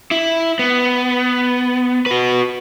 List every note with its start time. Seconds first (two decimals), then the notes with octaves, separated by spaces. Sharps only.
0.11 E4
0.59 B3
2.06 F#4 B4